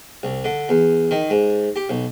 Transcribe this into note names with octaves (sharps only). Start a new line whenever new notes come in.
C2
D3
E2
D#3
G#2
G4
B1